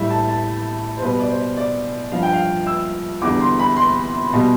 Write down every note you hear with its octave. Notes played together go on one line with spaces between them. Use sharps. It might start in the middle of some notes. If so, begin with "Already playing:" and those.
Already playing: A2 G3 E5
A5
A5
C5
B2 G3 B4
D5
C5
D5
G2 F3 F5
G5
F5
E6
E2 D3 G3 D6
C6
B5
C6
B2 G3